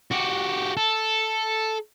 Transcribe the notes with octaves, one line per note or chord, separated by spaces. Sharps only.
F#4 G4
A4